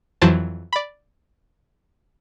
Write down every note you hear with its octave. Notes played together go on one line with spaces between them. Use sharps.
F2 E3 F#3 C5 A5 A6
D5 B5